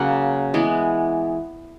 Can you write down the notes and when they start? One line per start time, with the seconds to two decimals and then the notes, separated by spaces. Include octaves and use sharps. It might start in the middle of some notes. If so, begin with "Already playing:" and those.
Already playing: C#3 F#3 A#3 F#5
0.54 E3 G#3 B3